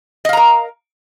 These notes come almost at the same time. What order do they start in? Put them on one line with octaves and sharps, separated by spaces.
D#5 F5 A#5 A#4